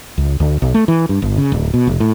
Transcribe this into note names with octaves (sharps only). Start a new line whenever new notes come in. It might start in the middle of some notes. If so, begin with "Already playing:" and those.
C#2
D2
B1
A3
E3
G2
G1
C#3
D1
B2
F1
A2